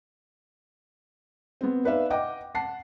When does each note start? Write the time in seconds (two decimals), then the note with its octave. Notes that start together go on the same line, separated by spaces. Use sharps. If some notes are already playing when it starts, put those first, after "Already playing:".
1.61 B3 C4
1.84 D#4 B4 D5 E5 F5
2.10 D#5 F#5 G5 D6
2.55 F#5 A5 C7